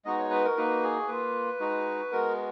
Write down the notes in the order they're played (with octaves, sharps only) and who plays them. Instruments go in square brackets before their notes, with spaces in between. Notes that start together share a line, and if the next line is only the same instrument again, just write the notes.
[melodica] G#3 B3 D#4 F#4 D#5
C#5
B4
A#4
A#3 D#4 F#4 B4
G#4
A#3 F4 B4
G#3 D#4 F#4
G#3 B3 F#4 A#4